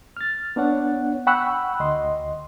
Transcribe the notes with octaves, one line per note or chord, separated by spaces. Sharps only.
F6 A6
B3 D4 C#5 F#5
F#5 G5 B5 C#6 E6 F#6
D2 D#5 C6